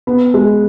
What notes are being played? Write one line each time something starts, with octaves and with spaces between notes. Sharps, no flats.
B3
G#3